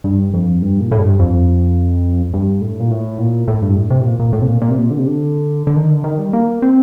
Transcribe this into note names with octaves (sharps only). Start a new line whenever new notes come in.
G2
F2
G2
A#2
A2
G2
F2
G2
A2
A#2
A2
A#2
A2
G2
A2
C3
A2
A#2
A#2
A2
C3
A#2
A#2
C3
A#2
D3
C3
D3
D3
D#3
D3
D#3
G3
A#3
C4